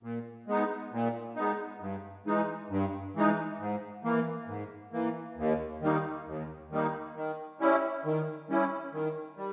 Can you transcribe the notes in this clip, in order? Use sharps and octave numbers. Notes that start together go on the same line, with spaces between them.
A#2
G#3 B3 D#4
A#2
G#3 B3 D#4
G2
E3 G#3 D#4
G2
E3 G#3 D#4
G#2
E3 A#3
G#2
E3 A#3
D#2
D#3 G3 A#3 D#4
D#2
D#3 G3 A#3 D#4
D#3
G3 C#4 E4
D#3
G3 C#4 E4
D#3
G3